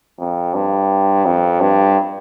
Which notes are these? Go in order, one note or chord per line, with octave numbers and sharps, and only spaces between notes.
F2
G2
F2
G2